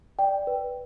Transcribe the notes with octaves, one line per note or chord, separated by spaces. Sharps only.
D5 G5
B4